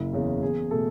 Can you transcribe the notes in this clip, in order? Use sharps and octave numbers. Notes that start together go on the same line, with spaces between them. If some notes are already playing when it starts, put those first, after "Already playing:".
Already playing: F#1 E4
E2 C#3
E2 G#4
B2 A3 A4